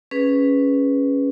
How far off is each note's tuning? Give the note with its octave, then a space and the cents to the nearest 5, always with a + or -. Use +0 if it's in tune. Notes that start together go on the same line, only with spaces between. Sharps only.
C#4 +0 G#4 +0 B4 +0